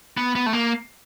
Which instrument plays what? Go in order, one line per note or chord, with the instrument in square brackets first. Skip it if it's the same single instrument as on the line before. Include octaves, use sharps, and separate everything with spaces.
[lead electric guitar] B3
B3
A3
A#3